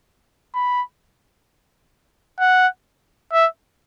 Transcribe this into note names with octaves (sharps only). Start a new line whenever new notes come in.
B5
F#5
E5